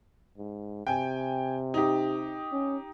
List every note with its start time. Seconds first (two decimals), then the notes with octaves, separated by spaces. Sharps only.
0.38 G#2
0.87 C3 G5 G#5
1.74 D#4 G4
2.52 C#4